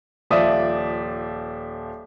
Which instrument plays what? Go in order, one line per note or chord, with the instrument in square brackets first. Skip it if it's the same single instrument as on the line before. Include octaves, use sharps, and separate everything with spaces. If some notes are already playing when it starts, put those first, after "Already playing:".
[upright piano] D#1 F3 D5 E5 D#6